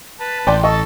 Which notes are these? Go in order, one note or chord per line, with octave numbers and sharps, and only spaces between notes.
B4 A5
A1 D5 G5 C6
A4 D#5 A5 C#6